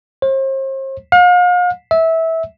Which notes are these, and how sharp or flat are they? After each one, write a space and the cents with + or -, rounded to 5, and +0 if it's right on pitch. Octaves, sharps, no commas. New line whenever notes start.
C5 +40
F5 +40
E5 -20